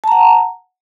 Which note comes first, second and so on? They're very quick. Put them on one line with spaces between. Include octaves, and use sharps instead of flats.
A5 A#5 F#5